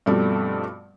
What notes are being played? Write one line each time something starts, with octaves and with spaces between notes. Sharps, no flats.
G2 B2 F3 G3 A3 C4